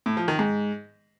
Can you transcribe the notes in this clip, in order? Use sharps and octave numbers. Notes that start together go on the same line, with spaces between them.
A2
F3
D#3
G#2